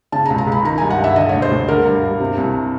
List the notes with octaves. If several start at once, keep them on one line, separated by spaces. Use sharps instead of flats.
C#3 A5
A#5
C#2
A#5
C#2
B5
D#3 A#5
G2 G#5
F#5
G2 E5
D3 D#5
D2 C#5
C5
D2
D3 A#4
G2
G2
C3
C2